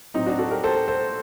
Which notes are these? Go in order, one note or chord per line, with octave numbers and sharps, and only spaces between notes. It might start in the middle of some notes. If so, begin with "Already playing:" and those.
A2 F#3 C4 D#4
D4 F#4
F#4 A4
G4 A#4
A4 C5
A4 C5